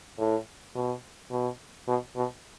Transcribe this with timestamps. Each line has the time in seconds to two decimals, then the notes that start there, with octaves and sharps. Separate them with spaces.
0.18 A2
0.75 B2
1.31 B2
1.87 B2
2.16 B2